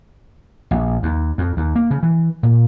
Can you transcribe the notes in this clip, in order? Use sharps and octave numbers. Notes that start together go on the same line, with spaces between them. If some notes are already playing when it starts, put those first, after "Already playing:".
A#1
D#2
F2
D#2
A#3
C#3
E3
A#2